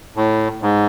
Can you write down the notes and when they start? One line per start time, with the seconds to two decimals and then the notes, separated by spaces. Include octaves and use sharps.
0.16 A2
0.62 G#2